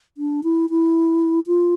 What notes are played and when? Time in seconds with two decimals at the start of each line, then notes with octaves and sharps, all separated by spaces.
0.17 D4
0.43 E4
0.70 E4
1.47 F4